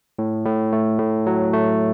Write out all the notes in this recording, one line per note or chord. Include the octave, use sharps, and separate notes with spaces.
A2
A2
A3
A2
F#3
A3